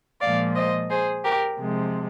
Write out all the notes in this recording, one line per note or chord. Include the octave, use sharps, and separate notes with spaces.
A#2 F3 G#3 D5 F5
C5 D#5
G#4 C5
G4 A#4
C3 F3 G#3